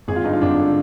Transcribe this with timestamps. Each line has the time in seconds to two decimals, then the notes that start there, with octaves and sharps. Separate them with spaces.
0.08 G#1 G#4
0.16 F4
0.24 G2 D3 D#4
0.33 F4
0.41 G#1 D4
0.60 D3